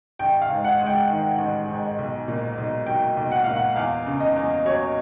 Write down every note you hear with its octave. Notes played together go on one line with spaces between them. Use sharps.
A1 G5
F5
G#2
F#5
G#3
G5
D#3
A1
G#2
B1
A#2
B1
F#3 G5
B1
F#5
A#2 F5
F#5
E2 F5
C#3
D#5
E2
F#3 C#5